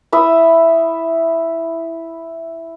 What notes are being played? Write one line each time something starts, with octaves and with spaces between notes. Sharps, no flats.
E4 E5 B5 D#6